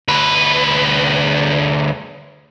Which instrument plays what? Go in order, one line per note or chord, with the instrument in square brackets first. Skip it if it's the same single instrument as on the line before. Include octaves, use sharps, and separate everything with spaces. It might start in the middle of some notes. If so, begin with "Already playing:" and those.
[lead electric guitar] D2 B4